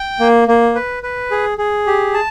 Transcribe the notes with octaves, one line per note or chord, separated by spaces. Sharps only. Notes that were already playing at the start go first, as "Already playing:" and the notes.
Already playing: G5
A#3
A#3
B4
B4
G#4
G#4
G4
A5